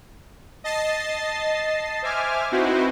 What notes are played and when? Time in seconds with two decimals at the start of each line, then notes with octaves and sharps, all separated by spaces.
0.64 D#5 A5 A6 C7
2.02 C5 E5 G#5 D6 F6
2.51 C4 D#4 E4 F#4 B4 C5